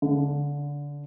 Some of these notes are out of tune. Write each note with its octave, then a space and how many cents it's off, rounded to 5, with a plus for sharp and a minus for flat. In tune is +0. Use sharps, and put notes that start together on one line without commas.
D3 -25